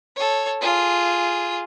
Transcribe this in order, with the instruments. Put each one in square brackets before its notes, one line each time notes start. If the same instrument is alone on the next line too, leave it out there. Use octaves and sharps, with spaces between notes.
[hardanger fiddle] A4 C#5
F4 G#4